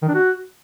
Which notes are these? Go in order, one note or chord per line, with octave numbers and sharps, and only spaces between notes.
D#3
D4
F#4